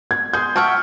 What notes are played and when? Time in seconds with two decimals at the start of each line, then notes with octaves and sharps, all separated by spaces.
0.11 G#6
0.33 G#4 C6 G6
0.56 E5 F#5 G5 A5 C#6 F6